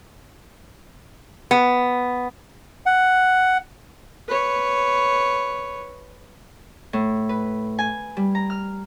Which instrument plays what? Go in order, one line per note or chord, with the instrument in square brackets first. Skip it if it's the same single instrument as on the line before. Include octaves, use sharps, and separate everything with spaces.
[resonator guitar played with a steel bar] B3
[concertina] F#5
[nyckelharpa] B4 C#5
[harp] A2
B4
G#5
G3
A#5
F6